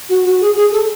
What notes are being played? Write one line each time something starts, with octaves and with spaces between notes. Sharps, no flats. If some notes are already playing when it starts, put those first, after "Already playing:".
F#4
F#4
G#4
G#4
A4